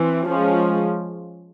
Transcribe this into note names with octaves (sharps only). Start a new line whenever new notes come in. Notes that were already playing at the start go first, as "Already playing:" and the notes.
Already playing: E3 C4
F3 G#3 C#4